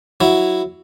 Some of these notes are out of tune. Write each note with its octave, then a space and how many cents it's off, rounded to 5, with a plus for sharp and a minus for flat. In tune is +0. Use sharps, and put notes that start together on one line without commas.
F#3 +0 E4 +0